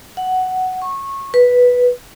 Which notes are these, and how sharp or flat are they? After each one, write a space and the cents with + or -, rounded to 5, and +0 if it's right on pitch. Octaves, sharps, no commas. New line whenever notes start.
F#5 +5
C#6 -20
B4 -5